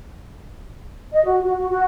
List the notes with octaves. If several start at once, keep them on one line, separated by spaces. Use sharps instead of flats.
D#5
F#4
F#4
F#4
F#4